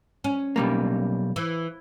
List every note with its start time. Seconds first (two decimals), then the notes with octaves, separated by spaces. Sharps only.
0.24 C#4
0.56 B1 G3 A#3
1.36 E3